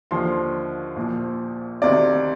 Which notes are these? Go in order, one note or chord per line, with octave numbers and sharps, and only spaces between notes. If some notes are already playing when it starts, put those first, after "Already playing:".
D#2 D3 F3 C6
A#1 A#2 F3
D2 C3 D#3 D5